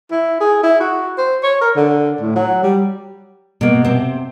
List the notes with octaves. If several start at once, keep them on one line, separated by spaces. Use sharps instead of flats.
E4
G#4
E4
F#4
C5
C#5
A#4
D3
A2
F#3
G3
B2 A#3
C3 C4